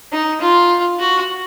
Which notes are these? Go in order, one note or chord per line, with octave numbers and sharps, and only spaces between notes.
D#4
F4
F#4